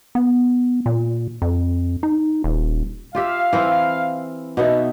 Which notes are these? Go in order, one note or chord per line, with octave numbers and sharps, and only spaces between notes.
B3
A#2
F2
D#4
D#1
F4 G4 E5 F5
E3 C4 E4
B2 B3 D#4 E5